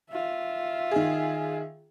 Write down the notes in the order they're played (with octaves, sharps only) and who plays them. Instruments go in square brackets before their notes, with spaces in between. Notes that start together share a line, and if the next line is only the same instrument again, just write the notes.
[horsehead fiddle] F4 E5
[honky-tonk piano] D#3 G#4